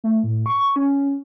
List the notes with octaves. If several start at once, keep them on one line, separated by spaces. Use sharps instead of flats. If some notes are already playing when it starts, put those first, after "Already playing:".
A3
A2
C#6
C#4